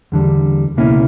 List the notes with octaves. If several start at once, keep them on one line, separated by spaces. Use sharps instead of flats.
E2 D3 G3
C#2 B2 A#3 C#4 E4